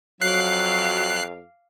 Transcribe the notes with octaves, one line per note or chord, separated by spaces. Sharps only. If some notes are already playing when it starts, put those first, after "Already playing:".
F2 F#3 F5 D6 F#6 C7